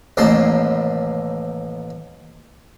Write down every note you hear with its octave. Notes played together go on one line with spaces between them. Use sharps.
A1 D#2 A2 C3 A5 C6